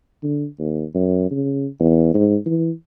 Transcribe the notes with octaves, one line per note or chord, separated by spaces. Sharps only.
D3
D#2
F#2
C#3
E2
G#2
E3